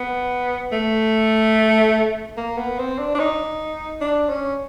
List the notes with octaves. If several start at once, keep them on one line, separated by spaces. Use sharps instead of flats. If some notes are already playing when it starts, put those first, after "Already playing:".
Already playing: B3
A3
A#3
B3
C4
D4
D4
D#4
D4
C#4